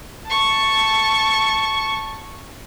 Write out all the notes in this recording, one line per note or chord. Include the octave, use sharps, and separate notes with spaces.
A5 C#6